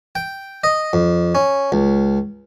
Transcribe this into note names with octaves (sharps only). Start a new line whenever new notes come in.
G5
D#5
F2
C#4
C#2